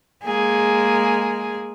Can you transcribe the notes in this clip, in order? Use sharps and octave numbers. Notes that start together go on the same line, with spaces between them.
G#3 A#3 G#4